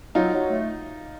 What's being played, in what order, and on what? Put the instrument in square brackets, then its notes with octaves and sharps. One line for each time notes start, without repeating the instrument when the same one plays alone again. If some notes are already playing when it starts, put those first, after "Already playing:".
[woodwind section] F#3 [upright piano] D#4 F4
[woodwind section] F#3
A3